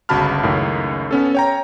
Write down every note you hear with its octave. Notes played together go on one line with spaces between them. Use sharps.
G1 C#2 F#4 A5 B5 F6
C#2 F#2 A2 D#3
B3 C#4 A4
C#5 G5 A#5